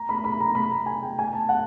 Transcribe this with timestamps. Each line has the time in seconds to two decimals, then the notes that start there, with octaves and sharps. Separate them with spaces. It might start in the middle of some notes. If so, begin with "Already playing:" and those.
Already playing: A#5
0.09 B5
0.24 B5
0.40 A#5
0.55 B5
0.71 A#5
0.86 G#5
1.02 G5
1.19 G#5
1.33 A5
1.49 F#5